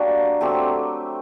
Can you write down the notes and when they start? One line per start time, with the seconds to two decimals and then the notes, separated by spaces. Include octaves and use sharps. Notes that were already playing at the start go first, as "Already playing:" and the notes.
Already playing: G3 A#3 D4 F#4
0.41 F#3 A3 C4 G4